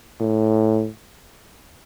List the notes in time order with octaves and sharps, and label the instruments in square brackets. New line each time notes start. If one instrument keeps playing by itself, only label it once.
[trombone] A2